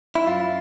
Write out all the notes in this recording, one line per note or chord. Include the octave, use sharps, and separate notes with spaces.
E4
F#2 F4